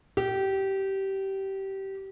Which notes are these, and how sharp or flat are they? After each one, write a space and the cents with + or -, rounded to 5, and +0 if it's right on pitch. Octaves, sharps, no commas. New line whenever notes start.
G4 -20